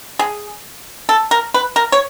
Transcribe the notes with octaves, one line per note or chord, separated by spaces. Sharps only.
G#4
A4
A#4
B4
A#4
C#5